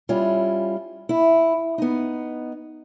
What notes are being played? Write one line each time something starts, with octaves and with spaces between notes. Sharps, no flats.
G3 C#4 E4 F4
E4
B3 D#4